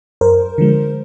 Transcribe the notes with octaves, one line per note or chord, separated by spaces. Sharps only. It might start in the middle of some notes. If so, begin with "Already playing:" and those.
F#2 A#4 C5
D3 F3 G#3